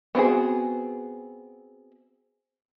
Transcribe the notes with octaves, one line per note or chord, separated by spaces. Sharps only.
B3 C4 F#4 G#4